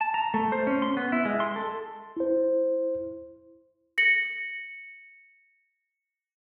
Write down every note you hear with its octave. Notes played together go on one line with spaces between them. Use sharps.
A5
A#5
A3
C5
C#4
C6
B3
E4
G#3
C6
A4
E4 C5
A#6 C#7 F#7